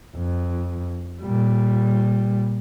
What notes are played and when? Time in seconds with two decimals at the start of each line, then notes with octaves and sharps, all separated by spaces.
0.17 F2
1.23 A#2 G3